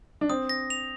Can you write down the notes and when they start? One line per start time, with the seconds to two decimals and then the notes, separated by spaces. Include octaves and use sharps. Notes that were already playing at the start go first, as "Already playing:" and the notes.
0.21 D4
0.30 C4 D#6
0.49 A#6
0.70 F7